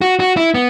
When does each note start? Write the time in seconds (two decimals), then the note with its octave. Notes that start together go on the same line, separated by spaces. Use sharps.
0.01 F#4
0.20 F#4
0.37 E4
0.54 B3